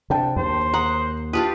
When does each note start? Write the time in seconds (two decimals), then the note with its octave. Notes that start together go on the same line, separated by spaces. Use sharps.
0.10 C3 D4 G5 A5
0.36 D#2 C5
0.74 F#5 A#5 D#6
1.33 D4 F4 G4 B4 D#6